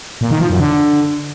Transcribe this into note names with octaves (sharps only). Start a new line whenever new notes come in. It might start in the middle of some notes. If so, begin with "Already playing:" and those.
A#2
D#3
F3
F#2
D3